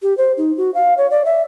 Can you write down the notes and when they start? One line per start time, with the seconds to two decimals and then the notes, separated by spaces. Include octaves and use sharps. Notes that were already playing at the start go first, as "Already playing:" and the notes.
0.02 G4
0.17 C5
0.37 D#4
0.57 F#4
0.74 F5
0.98 C#5
1.11 D5
1.25 E5